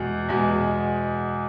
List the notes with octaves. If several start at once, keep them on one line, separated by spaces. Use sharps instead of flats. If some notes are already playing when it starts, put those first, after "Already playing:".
Already playing: E2 B2 G#3
E2 B2 G#3